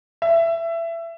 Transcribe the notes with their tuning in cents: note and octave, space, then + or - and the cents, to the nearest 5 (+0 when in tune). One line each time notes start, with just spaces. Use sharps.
E5 +20